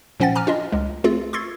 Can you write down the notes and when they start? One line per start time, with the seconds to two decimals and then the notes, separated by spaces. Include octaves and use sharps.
0.20 A#2 F3 C#4 F#5 G5 A6
0.36 G#5 A#5 D6 F6
0.47 D4 F4 D#5
0.72 C#2 G#3
1.04 A3 C4 F4 G#4
1.33 C6 C#6 E6 G#6 A6 C7